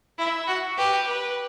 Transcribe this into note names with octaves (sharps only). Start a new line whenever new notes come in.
E4 E5
F#4
G4 B4
B4